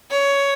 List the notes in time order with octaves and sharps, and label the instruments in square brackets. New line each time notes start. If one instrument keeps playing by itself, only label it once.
[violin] C#5